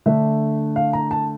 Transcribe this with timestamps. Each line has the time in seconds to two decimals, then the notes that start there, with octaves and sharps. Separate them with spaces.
0.06 D3 A3 D4 E5
0.76 F5
0.93 A#5
1.11 A5